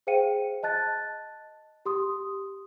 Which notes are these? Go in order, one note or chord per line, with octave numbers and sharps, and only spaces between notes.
G#4 C5 F5 G5 C#7 D#7
D#5 A5 F#6 A6
G4 C6 D#6